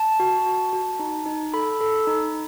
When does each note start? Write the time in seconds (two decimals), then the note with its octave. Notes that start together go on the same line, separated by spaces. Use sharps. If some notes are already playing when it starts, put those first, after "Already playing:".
Already playing: A5
0.20 F#4
0.46 F#4
0.73 F#4
0.99 D#4
1.26 D#4
1.54 A4 B5
1.81 A4
2.07 D#4